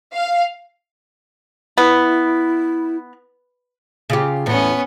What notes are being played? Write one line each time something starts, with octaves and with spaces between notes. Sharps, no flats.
F5
B3 E4
C#3 F4 G4
E2 A2 B3 C#4